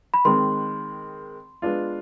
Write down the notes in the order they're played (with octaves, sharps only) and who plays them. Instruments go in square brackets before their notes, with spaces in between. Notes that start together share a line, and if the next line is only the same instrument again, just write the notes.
[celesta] B5
[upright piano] D#3 G#3 C4 [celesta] C6
[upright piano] G#3 B3 D4 F4